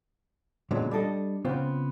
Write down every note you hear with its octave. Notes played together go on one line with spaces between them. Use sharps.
A#2 D3 F#3 G#3 B3
G3 D4 A4 D#5
C#3 B3 C4 F4 C5